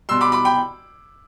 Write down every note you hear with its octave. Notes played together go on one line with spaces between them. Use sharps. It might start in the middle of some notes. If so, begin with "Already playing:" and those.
B2 G3 C6 E6
B5 D6
B5 D6
G5 B5